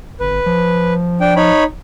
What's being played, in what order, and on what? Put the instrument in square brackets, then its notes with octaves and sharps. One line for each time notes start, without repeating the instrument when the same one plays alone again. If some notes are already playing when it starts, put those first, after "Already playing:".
[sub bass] G1 [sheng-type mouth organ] B4
[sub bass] F3
[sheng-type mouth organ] D4 G5
D#4 C#5 B5